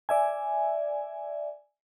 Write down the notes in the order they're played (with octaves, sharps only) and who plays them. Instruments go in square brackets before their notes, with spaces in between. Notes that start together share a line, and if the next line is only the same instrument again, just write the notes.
[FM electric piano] D5 E5 G#5